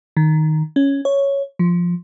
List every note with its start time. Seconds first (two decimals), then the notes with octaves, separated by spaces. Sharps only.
0.17 D#3
0.76 C#4
1.05 C#5
1.59 F3